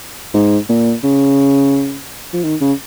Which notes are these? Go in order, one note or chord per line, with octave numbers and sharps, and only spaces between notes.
G#2
A#2
C#3
F3
D#3
C#3